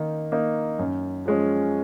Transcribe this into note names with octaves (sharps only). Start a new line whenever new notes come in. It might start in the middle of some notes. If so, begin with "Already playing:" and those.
Already playing: D#3 A#3 D#4
A#3 D#4
F#2
F3 G#3 C#4